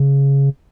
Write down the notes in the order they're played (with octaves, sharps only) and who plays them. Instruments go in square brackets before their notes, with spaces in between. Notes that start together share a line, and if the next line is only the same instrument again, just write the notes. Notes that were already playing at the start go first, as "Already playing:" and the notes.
Already playing: [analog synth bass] C#3